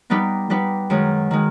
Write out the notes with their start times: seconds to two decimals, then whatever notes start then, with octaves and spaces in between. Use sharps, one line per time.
0.10 G3 B3 D#4 G4 B4
0.50 G3 B3 D#4 G4 B4
0.90 F#2 D#3 G#3
1.31 D#3 G#3